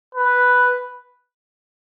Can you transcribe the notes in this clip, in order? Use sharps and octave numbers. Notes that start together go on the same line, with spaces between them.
B4